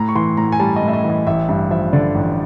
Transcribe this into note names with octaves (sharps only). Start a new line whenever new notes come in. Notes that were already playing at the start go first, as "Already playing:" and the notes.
Already playing: A2 A#5
C#6
E3 C6
A2 A#5
G#5
G3 A5
D#5
A2
E5
D#5
E3
D#5
A1 E5
G2 E5
F3 E5
D3 D5
A1